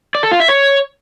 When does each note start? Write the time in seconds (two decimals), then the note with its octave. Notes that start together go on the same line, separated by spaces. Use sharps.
0.15 D5
0.23 A4
0.32 F4
0.40 E5
0.48 C#5